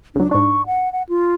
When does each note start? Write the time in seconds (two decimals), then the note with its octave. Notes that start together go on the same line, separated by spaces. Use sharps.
0.15 C#2 F#3 D4
0.31 G#2 D4 C#6
0.66 F#5
0.93 F#5
1.09 F4